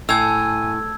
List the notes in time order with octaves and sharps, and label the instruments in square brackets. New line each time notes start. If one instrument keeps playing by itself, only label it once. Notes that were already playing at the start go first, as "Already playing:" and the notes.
[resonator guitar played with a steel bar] A2 [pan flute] G#5 [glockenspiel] E6 G#6